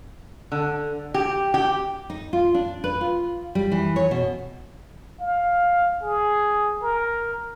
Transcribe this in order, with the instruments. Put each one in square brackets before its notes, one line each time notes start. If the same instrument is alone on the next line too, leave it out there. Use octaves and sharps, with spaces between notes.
[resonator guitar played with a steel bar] D3
G4
G4
[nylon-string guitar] D#4
F4
D4
B4
F4
G3
E3
C#5
B2
[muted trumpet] F5
G#4
A#4